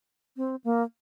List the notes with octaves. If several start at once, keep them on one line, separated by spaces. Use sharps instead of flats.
C4
A#3